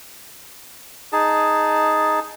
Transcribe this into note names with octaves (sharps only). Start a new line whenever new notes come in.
D#4 G#4 A5